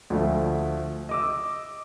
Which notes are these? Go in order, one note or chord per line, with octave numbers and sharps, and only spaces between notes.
D2 F3 A3
D#5 D6 E6